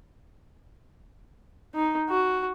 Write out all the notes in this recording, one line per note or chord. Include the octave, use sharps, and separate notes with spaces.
D#4
F#4